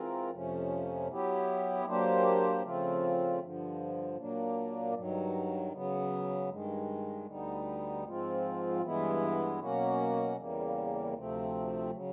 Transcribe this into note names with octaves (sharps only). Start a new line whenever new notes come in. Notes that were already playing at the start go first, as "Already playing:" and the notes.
Already playing: E3 G#3 C4 F4 A#4
F2 C3 F3 A3 C#4
F#3 B3 E4 G4
F#3 A#3 D4 G4 C5
C#3 F3 A3 C4 F4
G2 D3 F3
A#2 F#3 A#3 D4
G2 D#3 F#3
C#3 F#3 B3
G2 D#3 G#3
D2 D3 G3 B3 D#4
G#2 F3 G#3 C4 F4
G2 E3 G#3 B3 E4
B2 F#3 A#3 C#4 F#4
E2 C#3 E3 G3 A#3
D2 C3 F3 A3 C4
C#3 F#3